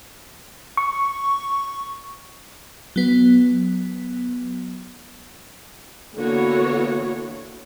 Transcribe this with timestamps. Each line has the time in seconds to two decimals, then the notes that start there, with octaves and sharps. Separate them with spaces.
0.77 C#6
2.96 F#3 B3
6.15 D3 E3 A#3 B3 F#4 C#5